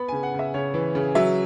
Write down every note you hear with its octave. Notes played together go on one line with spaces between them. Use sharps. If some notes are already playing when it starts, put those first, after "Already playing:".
Already playing: B3 B5
C#3 G#5
F#5
C#3
E5
C#3 C#5
E3
C#3
F#3 E5